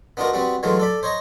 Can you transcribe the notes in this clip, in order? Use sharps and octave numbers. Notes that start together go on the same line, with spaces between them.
B3 D4 D#4 F4 F#4 A#4
G3 B3 C4 F#4
E3 F#3 G#3 A3 D#4 F4
A4 D5 B5
C5 C#5 D#5 A#5